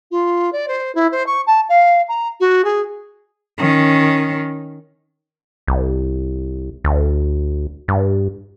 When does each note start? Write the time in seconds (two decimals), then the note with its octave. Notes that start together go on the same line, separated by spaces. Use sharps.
0.11 F4
0.52 D5
0.68 C5
0.95 E4
1.11 C5
1.26 C#6
1.46 A5
1.69 F5
2.08 A#5
2.40 F#4
2.64 G#4
3.58 D#3 C#4
5.67 C2
6.84 D2
7.88 G2